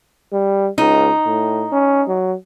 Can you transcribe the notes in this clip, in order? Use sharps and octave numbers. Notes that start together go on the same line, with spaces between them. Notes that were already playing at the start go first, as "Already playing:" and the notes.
G3
C#2 D#4
A2
C#4
F#3